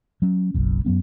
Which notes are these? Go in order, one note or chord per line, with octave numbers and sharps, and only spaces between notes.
F#3 C#4
F#1 B1 F#2
F#2 F#3 B3 C#4